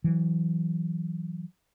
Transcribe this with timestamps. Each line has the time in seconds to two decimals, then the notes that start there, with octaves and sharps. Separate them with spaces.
0.04 E3 F#3